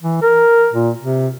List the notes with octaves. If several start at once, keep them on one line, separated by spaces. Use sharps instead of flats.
E3
A#4
A#2
C3